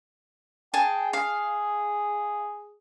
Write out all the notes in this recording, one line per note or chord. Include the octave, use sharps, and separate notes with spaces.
G#4 G5 A5
G#4 F5